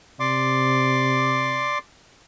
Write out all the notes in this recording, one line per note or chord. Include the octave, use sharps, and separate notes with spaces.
C3 D5 C6 D6